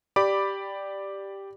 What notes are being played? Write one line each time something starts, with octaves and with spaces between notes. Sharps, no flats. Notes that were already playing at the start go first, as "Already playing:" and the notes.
G4 D5 B5 D6